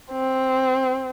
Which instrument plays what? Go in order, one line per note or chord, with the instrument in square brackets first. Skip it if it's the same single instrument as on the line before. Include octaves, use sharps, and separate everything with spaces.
[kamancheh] C4